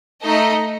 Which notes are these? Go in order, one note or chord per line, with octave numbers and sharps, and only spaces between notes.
A3 D#4 A4 D#5